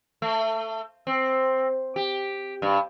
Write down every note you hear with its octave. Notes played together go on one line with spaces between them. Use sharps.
A3
C4
G4
G2